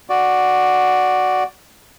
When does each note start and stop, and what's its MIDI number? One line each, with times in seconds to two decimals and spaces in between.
0.09 1.44 66
0.09 1.44 74